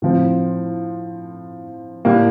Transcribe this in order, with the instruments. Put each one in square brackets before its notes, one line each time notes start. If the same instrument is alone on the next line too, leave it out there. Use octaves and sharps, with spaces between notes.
[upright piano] A2 F3 C4
A2 G3 A#3